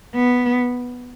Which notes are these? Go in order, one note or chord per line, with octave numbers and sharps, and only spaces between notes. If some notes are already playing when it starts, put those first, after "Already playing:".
B3